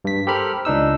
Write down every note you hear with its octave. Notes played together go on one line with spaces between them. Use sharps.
G2 B6
G4 A4 A#4 C5 B5 F6
C#2 D4 D#4 E6